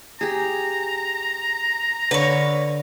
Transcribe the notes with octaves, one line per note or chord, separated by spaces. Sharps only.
G4 G#4 A#5
D3 B4 C#5 F5